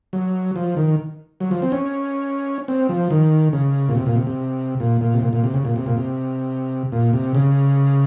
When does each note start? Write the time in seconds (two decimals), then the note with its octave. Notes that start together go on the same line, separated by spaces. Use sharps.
0.13 F#3
0.56 F3
0.77 D#3
1.40 F#3
1.51 F3
1.62 C4
1.72 C#4
2.68 C4
2.89 F3
3.11 D#3
3.53 C#3
3.89 A#2
3.95 C3
4.06 A#2
4.16 C3
4.27 C3
4.80 A#2
5.01 A#2
5.14 C3
5.22 A#2
5.33 A#2
5.44 C3
5.54 C#3
5.65 A#2
5.76 C3
5.86 A#2
5.97 C3
6.92 A#2
7.13 C3
7.35 C#3